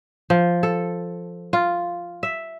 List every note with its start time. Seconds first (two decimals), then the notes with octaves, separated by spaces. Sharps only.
0.30 F3
0.63 A4
1.53 F4
2.23 E5